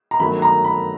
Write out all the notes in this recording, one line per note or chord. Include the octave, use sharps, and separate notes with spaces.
A#5
G1 F#2 D#3 F#3 A3 B5
A#5
B5